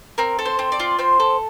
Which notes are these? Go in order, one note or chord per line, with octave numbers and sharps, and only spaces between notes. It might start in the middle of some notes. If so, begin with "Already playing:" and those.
C4 A#4
A4
C5
C4
D5
F4
C4 C5
A4